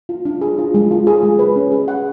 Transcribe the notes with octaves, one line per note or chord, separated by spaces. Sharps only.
F4
D4
G#4
F4
G#3
F4
G#4
G#3
B4
C#4
G#4
F#5